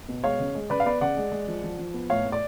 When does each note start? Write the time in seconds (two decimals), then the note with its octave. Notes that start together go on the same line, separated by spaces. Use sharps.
0.08 B2
0.24 G#3 C#5 F5
0.39 C#3
0.55 G#3
0.70 C#3 B4 D5
0.80 F5
0.85 B3 B4 D5
1.01 C#3 D5 F#5
1.17 G#3
1.32 G#3
1.47 F3
1.63 F3
1.78 F3
1.94 B3
2.10 A2 C#5 F5
2.25 A2
2.32 D5